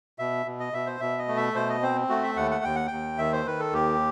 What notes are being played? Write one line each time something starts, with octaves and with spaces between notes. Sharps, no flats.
B2 E5
B2
D#5
B2 E5
C5
B2 E5
D#5
A3
E5
B2 C5
D#5
C4 C5
A3 F#4
E5
D#2 F#5
F#5
D#2 G5
F#5
D#2 G5
D#3 E5
C5
D#3 B4
A4
D#2 G4